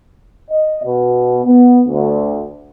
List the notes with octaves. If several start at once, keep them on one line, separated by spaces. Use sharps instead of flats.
D#5
B2
B3
D2